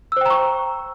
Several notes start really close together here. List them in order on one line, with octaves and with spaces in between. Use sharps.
E6 C5 G5 A#5 C#6